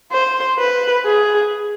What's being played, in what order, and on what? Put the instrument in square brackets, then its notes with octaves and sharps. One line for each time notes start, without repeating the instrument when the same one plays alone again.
[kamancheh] C5
B4
G#4